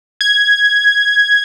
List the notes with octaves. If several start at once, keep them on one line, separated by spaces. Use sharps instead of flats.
G#6